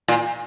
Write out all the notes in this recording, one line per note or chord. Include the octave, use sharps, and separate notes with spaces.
A#2